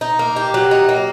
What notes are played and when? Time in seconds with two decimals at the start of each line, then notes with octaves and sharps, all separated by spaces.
0.01 D#4
0.19 A#3
0.37 G4
0.54 F#3
0.71 D#4
0.89 A#3